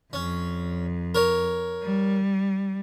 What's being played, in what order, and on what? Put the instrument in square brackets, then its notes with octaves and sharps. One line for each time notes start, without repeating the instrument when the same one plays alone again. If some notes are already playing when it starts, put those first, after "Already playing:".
[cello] F2 [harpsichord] C#4
[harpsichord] A#4 C#5
[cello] G3